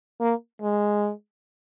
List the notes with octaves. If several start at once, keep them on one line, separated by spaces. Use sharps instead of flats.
A#3
G#3